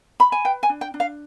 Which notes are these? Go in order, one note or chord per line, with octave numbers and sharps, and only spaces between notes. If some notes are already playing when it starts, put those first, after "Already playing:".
B5
G#5
B4 G5
G#5
D4
G5
D4
F5